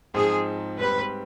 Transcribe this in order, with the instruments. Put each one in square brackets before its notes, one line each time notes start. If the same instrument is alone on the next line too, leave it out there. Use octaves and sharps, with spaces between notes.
[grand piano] G#2 F3 C4 D#4 [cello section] G#4
[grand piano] G#2 G3 C4 G4 [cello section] B4